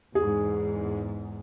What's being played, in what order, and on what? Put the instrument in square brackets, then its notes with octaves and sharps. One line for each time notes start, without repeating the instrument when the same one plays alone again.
[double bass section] E2 G#2 [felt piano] G#4